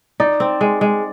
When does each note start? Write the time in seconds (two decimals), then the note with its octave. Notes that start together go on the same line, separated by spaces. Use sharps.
0.20 D#4 D5
0.40 C4
0.61 G#3
0.81 G#3